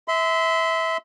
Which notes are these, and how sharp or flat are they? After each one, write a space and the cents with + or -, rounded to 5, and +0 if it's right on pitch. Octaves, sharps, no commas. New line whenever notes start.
E5 -20 C6 -35